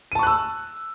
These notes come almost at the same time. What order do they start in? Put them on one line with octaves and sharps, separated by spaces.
D#7 A5 C#6 F#6 E6